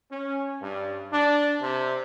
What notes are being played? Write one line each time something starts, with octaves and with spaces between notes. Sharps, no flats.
C#4
G2
D4
C3